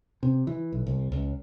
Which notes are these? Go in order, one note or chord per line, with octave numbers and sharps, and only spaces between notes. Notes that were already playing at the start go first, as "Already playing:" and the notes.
C3
E3
B1
C2
C#2